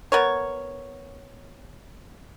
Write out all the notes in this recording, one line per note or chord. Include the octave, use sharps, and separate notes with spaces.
B3 A#4 C#5